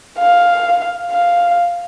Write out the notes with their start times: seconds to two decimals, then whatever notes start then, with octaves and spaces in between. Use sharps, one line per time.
0.19 F5
1.12 F5